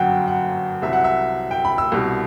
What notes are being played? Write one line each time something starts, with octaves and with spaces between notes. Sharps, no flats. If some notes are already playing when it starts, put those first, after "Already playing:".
Already playing: G1 F#2 F#3 F#5 G5
F#5
C2 C3 F#3 E5
F#5
E5
G5
B5
E6
C2 B2 G3